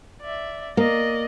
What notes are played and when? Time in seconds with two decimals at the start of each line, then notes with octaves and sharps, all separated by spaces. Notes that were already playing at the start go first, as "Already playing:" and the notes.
0.22 D5 E5
0.77 A#3 D5 D#5